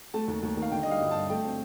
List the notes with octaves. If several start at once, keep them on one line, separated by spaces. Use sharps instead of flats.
A3 A5
D#2
D#2
D#3
F5
D3 G5
D#5
G3
F5
G1
G2 A5
A3 G5
C4